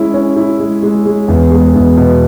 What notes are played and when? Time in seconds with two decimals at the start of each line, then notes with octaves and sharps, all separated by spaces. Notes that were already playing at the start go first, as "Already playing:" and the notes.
Already playing: G#3 C#4 E4
0.14 C#4
0.36 E4
0.59 G#3
0.83 G#3
1.05 G#3
1.28 E2
1.51 G#3
1.75 E2
1.97 B2